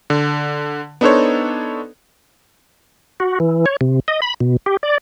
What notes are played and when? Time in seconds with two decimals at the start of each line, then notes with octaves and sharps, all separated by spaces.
0.10 D3
1.01 B3 D4 D#4 A4 C5 C#5
3.20 F#4
3.40 E3
3.66 C#5
3.81 C3
4.08 D#5
4.22 B5
4.40 B2
4.66 G4
4.83 D5